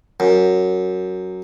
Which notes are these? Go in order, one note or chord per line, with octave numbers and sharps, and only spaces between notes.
F#2